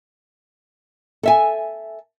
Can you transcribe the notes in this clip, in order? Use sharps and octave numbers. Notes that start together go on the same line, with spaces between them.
A4 E5 G#5